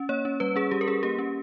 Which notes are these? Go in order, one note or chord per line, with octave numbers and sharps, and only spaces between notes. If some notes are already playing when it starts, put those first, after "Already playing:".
Already playing: C#4
A#3 C#5
C#4
G3 B4
C#4 G#4
G3 G4
A#4
C#4 G#4
A#3 G4
C#4